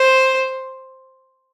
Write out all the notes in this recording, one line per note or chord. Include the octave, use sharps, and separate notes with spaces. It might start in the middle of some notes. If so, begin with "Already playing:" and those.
Already playing: C5